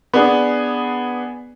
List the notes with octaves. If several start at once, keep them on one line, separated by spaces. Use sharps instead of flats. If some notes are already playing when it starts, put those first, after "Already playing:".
B3 D4 G#4